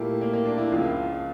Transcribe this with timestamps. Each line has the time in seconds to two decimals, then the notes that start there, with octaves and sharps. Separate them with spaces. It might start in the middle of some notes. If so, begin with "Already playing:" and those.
Already playing: A#2 A3 A#3 E4 G4
0.21 A#3
0.33 A#3
0.45 D4
0.58 E4
0.71 C#2 C#3 F3 F4